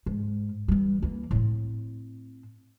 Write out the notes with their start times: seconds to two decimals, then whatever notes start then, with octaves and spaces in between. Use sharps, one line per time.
0.06 G#2
0.68 E3 G3
1.02 E3 A#3
1.31 A2 C4